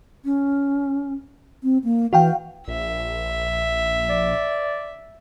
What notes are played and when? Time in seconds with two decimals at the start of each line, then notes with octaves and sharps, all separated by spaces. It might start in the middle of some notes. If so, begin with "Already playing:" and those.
0.25 C#4
1.63 C4
1.84 A#3
2.13 E3 F#4 F5 G5
2.68 A#1 E5
4.09 D5